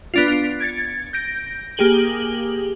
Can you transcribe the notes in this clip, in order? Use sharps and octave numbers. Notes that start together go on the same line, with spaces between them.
B3 D4 F4
D7
G#6 A6 C#7
G6 A#6 D7
A#3 G4 G#4 F#7 G7